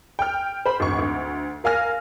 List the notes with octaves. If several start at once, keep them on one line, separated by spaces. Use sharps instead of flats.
G5 F6
C5 B5
G#1 D2 C#6
D2
A#4 F5 G#5 F6 A#6